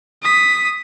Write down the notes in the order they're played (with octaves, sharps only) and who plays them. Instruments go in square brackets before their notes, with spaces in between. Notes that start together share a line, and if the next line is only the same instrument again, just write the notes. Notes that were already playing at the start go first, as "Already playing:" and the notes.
[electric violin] D#6 B6